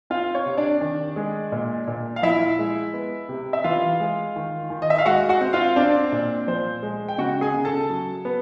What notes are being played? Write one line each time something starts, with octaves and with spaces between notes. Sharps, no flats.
C4 F4 F5
C#5
C3
D4 D5
D#3
G#3
A#2
A#2
F5
F3 E4 E5
G#3
B3
C3
E5
E3 F4 F5
G#3
D#3
D#3
D#5
E5
F5
G#3 F#4 F#5
F#4 F#5
C4
F4 F5
C4 D4 D5
A#2
F3 C5
G#3
G5
C#3 F#4 F#5
G#4 G#5
C#3
A4 A5
F#3
B3